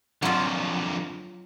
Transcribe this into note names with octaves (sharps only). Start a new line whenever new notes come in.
F2 D3 F#3 F4